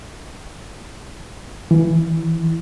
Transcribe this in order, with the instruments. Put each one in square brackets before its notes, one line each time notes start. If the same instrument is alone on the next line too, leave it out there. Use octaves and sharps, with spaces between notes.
[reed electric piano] E3